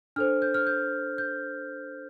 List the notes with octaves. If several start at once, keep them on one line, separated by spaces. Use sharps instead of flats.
D4 A4 C5 F6
G6
F6
G6
G6